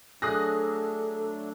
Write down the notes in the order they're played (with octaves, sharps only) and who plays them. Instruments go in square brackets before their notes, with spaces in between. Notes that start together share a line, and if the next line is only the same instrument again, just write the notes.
[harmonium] F#3 A3 D4 [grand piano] G#4 [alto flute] A4 [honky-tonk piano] D#6 F#6 A#6